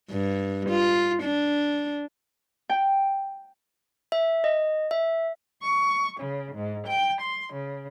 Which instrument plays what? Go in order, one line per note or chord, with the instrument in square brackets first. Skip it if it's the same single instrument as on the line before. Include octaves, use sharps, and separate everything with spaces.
[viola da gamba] G2
F4
D4
[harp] G5
[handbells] E5
D#5
E5
[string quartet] C#6
C#3
G#2
G5
C6
C#3